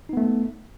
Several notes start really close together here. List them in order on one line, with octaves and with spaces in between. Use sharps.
D#4 B3 A3